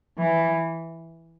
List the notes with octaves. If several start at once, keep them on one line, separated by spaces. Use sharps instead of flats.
E3